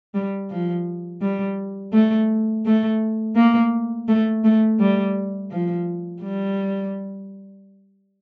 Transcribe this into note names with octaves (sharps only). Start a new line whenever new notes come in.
G3
F3
G3
A3
A3
A#3
A3
A3
G3
F3
G3